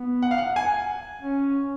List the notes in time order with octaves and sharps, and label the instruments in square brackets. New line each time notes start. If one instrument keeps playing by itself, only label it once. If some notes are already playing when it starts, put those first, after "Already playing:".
Already playing: [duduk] B3
[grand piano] F#5
F5
F#5
G#5
[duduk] C#4